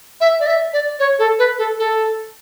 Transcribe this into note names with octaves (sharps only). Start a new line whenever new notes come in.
E5
D5
E5
D5
C#5
A4
B4
A4
A4